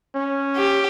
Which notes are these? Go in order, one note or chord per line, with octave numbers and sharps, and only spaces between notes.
C#4
G4